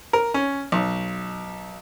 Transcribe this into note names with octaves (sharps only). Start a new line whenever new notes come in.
A#4
C#4
B1